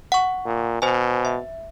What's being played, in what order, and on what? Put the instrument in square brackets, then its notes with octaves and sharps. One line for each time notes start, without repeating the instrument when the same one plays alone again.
[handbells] F#5 C#6
[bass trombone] A#2
[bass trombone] B2 [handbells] C5 G#5
[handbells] E5